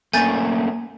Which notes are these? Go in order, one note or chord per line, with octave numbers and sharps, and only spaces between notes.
A3 A#3 C#4 G#5 G6 A6